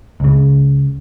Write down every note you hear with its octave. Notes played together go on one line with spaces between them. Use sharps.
C#2 C#3